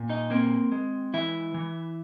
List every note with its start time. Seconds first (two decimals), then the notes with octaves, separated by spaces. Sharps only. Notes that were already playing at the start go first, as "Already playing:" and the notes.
Already playing: A#2
0.09 D#4 D#5
0.30 A#3 C4 A#4
0.72 G#3
1.14 E3 E4 E5
1.54 E3